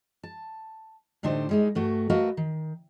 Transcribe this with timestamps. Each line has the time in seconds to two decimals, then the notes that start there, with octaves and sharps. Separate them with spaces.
0.23 A5
1.23 A2 D3 D4 D#4 G4 C5
1.49 G3 G#3 D#4
1.75 G2 A3 F#4
2.10 A3 F#4 A#4 B4 D#5 F5
2.37 D#3